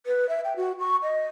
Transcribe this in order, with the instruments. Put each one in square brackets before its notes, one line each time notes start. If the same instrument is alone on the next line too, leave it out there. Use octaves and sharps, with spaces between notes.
[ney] B4
E5
G5
F#4
C#6
D#5